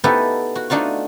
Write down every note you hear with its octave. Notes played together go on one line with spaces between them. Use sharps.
B3 D#4 E4 G4 A4 B4
F#4
A3 D4 D#4 F4 F#4